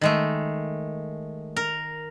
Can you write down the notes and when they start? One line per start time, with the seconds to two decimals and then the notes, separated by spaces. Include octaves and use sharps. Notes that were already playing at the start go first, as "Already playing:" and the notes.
0.01 D#3 G#3 A3
1.56 A#4